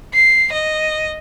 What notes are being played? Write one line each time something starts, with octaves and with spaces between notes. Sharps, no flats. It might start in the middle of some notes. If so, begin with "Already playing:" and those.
C7
D#5